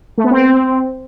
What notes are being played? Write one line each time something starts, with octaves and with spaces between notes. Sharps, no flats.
A3
B3
C4